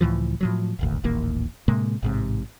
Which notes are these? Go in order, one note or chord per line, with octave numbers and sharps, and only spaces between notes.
C#2 A2 E3 F3
A2 F3 F#3
D#1 G#1 D2
D#1 A1 D#2 A#3
A2 C3 G#3 A#3
A1 G#2 C3